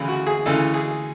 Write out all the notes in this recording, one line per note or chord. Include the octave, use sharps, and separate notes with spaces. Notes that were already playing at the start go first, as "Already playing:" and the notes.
Already playing: D2 C#3 E3 E4
F#4
G#4
D2 C#3 E3 A4
G#4